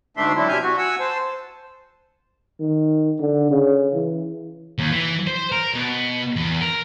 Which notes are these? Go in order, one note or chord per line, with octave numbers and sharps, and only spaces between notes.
D2 G#2 A3 D4 E5 C6
F#3 C4 D4 E4
C3 E5 G#5 F6 G6
F#4
F#5 G#5 E6
C5 A5
D#3
D3
C#3
E3
D#2
E3
C5
A#4
B2
E2
A#4